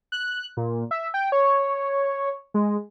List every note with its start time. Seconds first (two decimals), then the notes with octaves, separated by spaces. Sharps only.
0.12 F#6
0.57 A#2
0.91 E5
1.14 G5
1.32 C#5
2.54 G#3